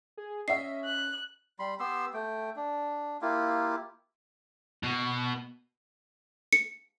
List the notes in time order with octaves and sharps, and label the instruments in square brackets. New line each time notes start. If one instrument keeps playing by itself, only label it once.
[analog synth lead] G#4
[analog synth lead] C#4 [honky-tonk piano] D#5 E5 [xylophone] C7
[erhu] F#6
[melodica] G3 B5 C6
B3 G4 C6 E6
A3 G5
D4
A#3 E4 F4 G4
[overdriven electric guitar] B2
[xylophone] C#7